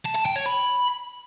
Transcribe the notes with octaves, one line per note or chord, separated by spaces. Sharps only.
A5
A5
G5
C#5
B5